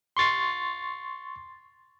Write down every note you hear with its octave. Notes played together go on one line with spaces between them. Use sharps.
C6 C#6 A6 C7